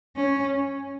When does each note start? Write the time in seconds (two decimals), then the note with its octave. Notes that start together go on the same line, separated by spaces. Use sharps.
0.16 C#4